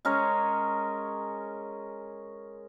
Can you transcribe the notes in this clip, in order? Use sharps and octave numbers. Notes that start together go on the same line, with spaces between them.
G#3 C#4 A#4 C#5